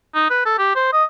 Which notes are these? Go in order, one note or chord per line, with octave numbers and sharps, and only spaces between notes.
D#4
B4
A4
G4
C5
D#5